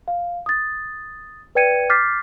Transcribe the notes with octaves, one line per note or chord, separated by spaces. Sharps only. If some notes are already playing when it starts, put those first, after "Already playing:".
F5
D#6 A6
B4 D5 G5 G#6 C#7 D#7
D6 F6 G6 A6 B6 C7